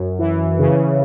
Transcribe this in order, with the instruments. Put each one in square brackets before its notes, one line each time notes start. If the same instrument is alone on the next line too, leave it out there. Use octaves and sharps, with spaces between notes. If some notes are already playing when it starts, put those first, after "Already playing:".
Already playing: [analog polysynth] F#2
E3
C#3